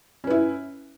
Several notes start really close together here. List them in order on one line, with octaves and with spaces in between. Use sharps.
C#4 B4 E4